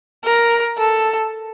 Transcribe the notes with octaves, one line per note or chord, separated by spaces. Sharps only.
A#4
A4